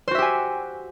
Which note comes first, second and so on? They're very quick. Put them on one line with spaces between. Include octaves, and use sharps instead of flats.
C5 F#4 E5 G4 G#5